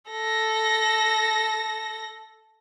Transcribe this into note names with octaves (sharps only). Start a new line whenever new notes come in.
A4 A#6